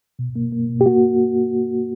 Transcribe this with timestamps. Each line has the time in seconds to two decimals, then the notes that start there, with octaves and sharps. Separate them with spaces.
0.19 B2
0.36 A#3
0.52 A#3
0.69 B2
0.81 G4
0.86 A#3 F#4